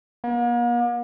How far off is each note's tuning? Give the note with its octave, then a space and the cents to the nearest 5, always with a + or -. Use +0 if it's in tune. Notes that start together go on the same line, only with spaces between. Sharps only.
A#3 +45